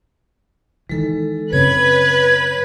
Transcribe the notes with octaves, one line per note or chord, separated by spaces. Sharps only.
D#3 E3 G#3 A4
F#2 C#3 C4 B4 C#5 G#6